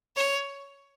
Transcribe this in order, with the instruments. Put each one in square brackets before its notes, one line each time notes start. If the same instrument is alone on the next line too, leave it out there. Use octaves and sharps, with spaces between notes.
[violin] C#5